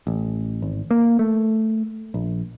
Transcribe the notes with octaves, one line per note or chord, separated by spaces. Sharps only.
A1
G#1
A#3
A3
A#1